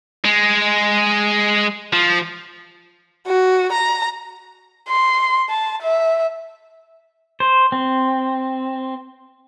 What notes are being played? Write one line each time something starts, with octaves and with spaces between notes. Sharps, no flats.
G#3
F3
F#4
A#5
C6
A5
E5
C5
C4